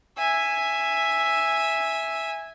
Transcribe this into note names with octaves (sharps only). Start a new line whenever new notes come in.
E5 G#5